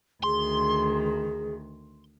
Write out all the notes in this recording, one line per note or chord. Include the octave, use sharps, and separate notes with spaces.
D2 D#3 G#4 C6